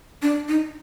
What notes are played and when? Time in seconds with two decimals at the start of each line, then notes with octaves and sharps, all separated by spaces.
0.22 D4
0.48 D#4